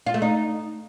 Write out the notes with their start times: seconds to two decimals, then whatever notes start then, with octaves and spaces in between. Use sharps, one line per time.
0.07 F4
0.14 A3
0.22 D#4